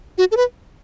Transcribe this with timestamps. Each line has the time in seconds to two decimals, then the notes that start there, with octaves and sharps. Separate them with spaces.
0.18 F#4
0.32 A4
0.37 B4